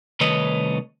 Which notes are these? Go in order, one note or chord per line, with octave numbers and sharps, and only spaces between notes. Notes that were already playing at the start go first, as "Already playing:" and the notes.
C2 D#3 A3 B4 C#5 D#5